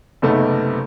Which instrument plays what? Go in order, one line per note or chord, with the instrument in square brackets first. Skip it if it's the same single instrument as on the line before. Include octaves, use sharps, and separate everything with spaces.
[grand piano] F#1 C3 A3 B3 D#4